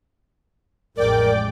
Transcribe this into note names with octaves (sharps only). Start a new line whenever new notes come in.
A1 F2 G#3 A#4 D5 G5 D6